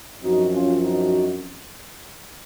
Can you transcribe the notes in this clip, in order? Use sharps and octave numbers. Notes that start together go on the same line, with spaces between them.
F#2 F3 C4 D#4 F#4
C#4 F4
D#4 F#4